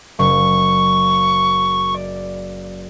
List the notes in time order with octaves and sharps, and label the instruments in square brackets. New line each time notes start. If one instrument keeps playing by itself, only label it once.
[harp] F#1 [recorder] C#6
[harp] D5